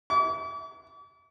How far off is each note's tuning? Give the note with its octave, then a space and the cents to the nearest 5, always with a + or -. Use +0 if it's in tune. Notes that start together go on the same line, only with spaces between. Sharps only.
D6 -45